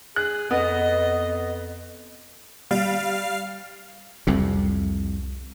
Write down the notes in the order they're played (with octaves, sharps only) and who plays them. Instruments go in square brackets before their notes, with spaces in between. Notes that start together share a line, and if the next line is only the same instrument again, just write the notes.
[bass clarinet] G#4 [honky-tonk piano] F#6
[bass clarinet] F2 [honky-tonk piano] B3 [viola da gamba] D#5
[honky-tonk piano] G3 [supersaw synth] F5
[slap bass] C2 F2 C3